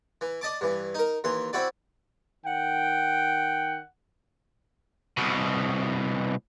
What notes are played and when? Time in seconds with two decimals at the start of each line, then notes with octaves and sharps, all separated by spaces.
0.21 E3
0.41 D5 D#5 A5 D6
0.61 G2 E3
0.95 D#4 A#4
1.24 D#2 E3 C6
1.53 C4 E4 F#4 D5
2.45 D#3 F#5 G5
5.17 C2 B2